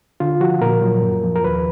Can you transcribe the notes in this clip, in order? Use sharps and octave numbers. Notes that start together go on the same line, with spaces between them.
D3 F4
F3 F#4
A#2 A#4
F#3
F#2
F3
A#4
D#2 B4